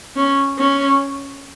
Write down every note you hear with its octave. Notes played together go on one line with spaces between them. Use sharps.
C#4
C#4